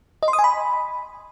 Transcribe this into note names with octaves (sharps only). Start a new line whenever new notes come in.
D#5
C6
D#6
G#5
B5